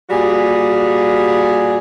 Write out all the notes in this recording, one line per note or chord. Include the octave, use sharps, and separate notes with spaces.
A#2 G3 F#4 G#4